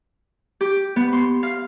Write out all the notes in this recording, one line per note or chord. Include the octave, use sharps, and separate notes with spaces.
G4
B3
C6
F5